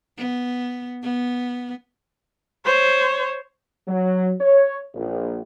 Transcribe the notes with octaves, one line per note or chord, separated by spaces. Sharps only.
B3
B3
C5 C#5
F#3
C#5
A#1